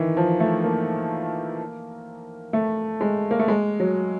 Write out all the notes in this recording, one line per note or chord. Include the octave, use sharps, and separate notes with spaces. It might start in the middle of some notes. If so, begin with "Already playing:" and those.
Already playing: D#3 E3
F3
A3
A#3
A3
G#3
A#3
A3
G#3
F#3